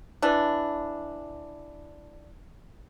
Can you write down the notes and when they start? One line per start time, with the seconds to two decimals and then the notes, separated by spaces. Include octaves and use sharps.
0.22 E3 D4